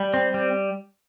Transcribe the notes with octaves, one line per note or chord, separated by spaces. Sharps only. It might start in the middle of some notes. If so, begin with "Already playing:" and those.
Already playing: G3
C4
G3